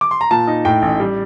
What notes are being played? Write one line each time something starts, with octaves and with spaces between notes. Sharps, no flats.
D6
C6
A#5
A#2 A5
D#4
A2 G5
A1
G3